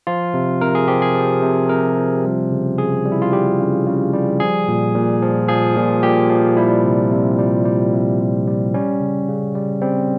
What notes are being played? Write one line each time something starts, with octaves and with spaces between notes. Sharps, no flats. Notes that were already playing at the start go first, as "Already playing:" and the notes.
F3 F4
C3
C3 A#4
G#4
F3 G4
G#4
F3
C3
C3 A#4
F3
G3
C#3
C#3 G#4
G3
E4
F4
G3 G4
C#3
C#3
G3
F3 G#4
A#2
A#2
F3
F3 G#4
A#2
A#2 G4
F3
G3 E4
C3
C3
G3
G3
C3
C3
G3
G3 C#4
C#3
C#3
G3
G3 C4